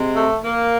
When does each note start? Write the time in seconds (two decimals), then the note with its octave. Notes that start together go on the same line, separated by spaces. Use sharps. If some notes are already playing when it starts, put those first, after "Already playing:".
Already playing: C3 G#3
0.13 A3
0.43 A#3